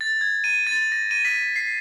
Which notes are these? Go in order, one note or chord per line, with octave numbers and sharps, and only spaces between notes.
A6
G#6
D#7
A6
A#6
D#7
B6
C7